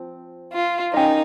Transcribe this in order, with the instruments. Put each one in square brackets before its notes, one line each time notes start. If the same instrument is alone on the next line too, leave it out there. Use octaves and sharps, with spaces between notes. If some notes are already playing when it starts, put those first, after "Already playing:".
Already playing: [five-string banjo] F3 C4
[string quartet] F4
[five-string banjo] C#4 G4 A#4 D#5 [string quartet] D#4